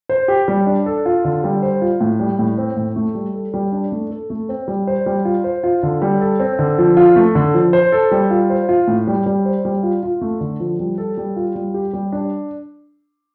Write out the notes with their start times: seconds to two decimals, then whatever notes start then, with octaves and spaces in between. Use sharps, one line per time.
0.09 C5
0.28 G4
0.48 G3
0.67 D4
0.86 A4
1.06 F4
1.24 D3
1.44 G3
1.63 C5
1.82 F4
2.01 A2
2.20 G3
2.39 A2
2.58 C4
2.76 A2
2.96 A3
3.15 G3
3.34 A4
3.54 G3
3.72 D4
3.92 A3
4.10 A4
4.30 A3
4.49 C4
4.68 G3
4.87 C5
5.06 G3
5.25 F4
5.44 C5
5.63 F4
5.83 D3
6.02 G3
6.21 A4
6.40 C4
6.59 D3
6.78 F3
6.97 F4
7.16 A3
7.35 D3
7.54 F3
7.73 C5
7.92 A4
8.11 G3
8.31 F4
8.50 C5
8.69 F4
8.88 A2
9.07 G3
9.26 G3
9.45 C5
9.65 G3
9.83 F4
10.03 F4
10.21 A3
10.41 D3
10.60 F3
10.79 G3
10.98 A4
11.17 G3
11.36 F4
11.55 G3
11.74 G4
11.93 G3
12.12 D4